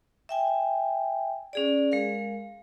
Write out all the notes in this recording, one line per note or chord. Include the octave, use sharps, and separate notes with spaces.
E5 G5 G#5
C#4 G#4 D5
G#3 A#4 F5